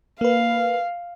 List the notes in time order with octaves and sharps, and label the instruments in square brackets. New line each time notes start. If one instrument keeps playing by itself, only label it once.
[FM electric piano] A#3 B4 [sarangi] F5